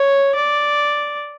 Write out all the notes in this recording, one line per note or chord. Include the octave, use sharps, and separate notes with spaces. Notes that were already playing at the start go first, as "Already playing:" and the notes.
Already playing: C#5
D5